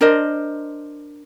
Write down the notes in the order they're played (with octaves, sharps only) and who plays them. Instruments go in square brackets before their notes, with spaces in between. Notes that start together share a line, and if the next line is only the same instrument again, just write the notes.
[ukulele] D4 A#4 C5 D#5